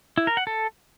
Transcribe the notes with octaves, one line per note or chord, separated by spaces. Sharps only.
E4
A#4
F#5
A4